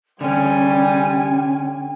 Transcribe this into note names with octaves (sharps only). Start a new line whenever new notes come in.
D3 G3 C#4 G5 G#5